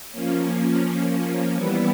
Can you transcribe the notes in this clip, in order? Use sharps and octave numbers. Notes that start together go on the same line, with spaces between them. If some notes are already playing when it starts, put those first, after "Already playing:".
F3 A#3 C#4
E3 G3 B3 E4